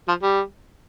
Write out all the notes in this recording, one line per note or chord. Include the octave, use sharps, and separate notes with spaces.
F3
G3